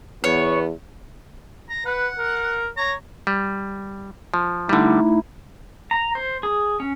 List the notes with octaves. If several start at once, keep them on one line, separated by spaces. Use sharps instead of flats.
E2 B3 C#5
A#5
B4 F#5
A#4
C#5 A#5
G3
F3
D3 G3 A3 D#4 E4
A#5
C5
G#4
C#4